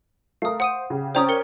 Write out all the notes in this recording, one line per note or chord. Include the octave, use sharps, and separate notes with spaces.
A3 A#4 F5 D#6
C5 F#5 D#6 D#7
C#3 G4
C#4 C5 D5 G5 A#5 D#6
A#4 C#7 G7